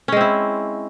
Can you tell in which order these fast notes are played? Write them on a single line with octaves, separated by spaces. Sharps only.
C#4 G#3 C4 E4